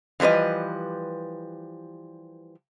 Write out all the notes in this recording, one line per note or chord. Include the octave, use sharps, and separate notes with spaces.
E3 F3 G3 B4 D#5